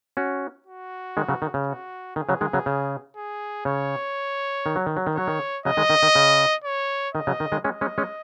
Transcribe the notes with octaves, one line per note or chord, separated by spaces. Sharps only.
C#4 F#4
F#4
D#3 G#3
C#3 F#3
D#3
C#3
F#4
D#3 G#4
C#3 F#3
D#3 G#3
C#3 F#3
C#3
G#4
C#3 C#5
D#3
F#3
D#3
F#3
D#3
F#3 C#5
D#3
C#3 F#3 D#5
D#3 G#3
D#3
D#3
C#3
C#5
D#3 D#5
C#3 F#3
D#3
D#3 G#3
G#3 C#4 D#5
G#3 C#4
G#3 C#4